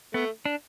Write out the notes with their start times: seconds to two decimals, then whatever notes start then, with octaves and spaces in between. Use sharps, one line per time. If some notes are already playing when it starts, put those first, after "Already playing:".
0.14 A3 B3
0.45 D4